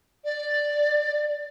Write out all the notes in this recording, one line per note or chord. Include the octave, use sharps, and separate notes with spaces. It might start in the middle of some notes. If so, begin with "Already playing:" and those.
D5